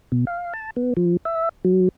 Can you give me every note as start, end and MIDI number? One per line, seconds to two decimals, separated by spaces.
0.12 0.25 47
0.27 0.53 77
0.54 0.70 81
0.76 0.94 59
0.97 1.17 53
1.25 1.49 76
1.65 1.88 54